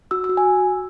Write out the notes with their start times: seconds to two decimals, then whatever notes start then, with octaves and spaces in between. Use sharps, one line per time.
0.11 F#4 E6
0.24 E6
0.29 F#4
0.37 G#5